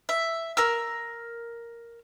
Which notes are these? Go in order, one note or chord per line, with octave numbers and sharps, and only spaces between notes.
E5
A#4 E6